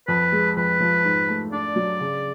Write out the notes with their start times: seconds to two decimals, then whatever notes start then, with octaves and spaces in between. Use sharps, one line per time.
0.08 F2 B4
0.32 G#3
0.57 F2 B4
0.80 F3
1.05 G#2
1.29 A3
1.53 D4 D5
1.76 F#3
2.01 C#3